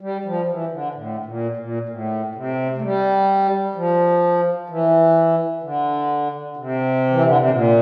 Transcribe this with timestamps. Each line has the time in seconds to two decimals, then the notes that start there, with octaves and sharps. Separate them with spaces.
0.01 G3
0.25 F3
0.49 E3
0.72 D3
0.94 A2
1.26 A#2
1.57 A#2
1.89 A2
2.35 C3
2.78 A3
2.82 G3
3.75 F3
4.70 E3
5.63 D3
6.57 C3
7.11 E3
7.24 D3
7.37 C3
7.50 A#2